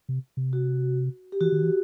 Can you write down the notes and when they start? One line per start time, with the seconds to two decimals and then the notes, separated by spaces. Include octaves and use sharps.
0.09 C3
0.37 C3
0.53 F#4
1.32 G4
1.41 E3 F#4
1.52 D#3
1.63 E3